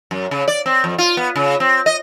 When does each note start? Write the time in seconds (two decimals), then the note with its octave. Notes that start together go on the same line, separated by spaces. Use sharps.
0.11 F#2
0.31 C#3
0.48 D5
0.66 C4
0.84 F2
0.98 F4
1.17 B3
1.36 C#3
1.60 C4
1.86 D#5